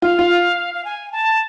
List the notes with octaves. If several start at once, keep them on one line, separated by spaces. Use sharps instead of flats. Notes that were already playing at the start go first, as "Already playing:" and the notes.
F4 F5
F4
F5
G#5
A5